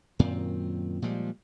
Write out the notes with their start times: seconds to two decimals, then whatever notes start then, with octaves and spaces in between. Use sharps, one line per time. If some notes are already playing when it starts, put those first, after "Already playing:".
0.19 F#2 A#2 D#3 C4
1.02 A#2 F3 G3 G#3